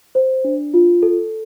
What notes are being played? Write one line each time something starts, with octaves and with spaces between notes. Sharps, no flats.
C5
D4
F4
A4